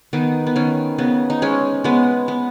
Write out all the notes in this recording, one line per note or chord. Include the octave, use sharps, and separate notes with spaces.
D#3 B3 D#4
B3
D#3 C#4
C#3 B3
D#4
G#3 C#4
G#3 B3
B3